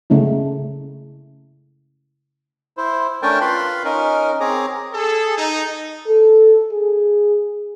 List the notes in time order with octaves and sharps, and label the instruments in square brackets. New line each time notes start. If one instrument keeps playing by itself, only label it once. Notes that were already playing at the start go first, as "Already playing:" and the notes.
[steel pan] C#3 A3 C#4 E4
[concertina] E4 C5
A3 C#4 D4 A#4 G5 A5
F4 B4 F5 B5 C6
C#4 D#4 A#4
C4 G#4 C#5 A#5 D6
[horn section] G#4 A4
D#4
[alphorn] A4
G#4